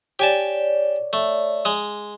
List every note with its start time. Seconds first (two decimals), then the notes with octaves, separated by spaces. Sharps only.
0.19 G4 C#5 D5 G#5 A5
1.13 A3
1.65 G#3 D#6